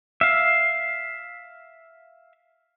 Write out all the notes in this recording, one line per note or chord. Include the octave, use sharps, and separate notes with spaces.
E5 F5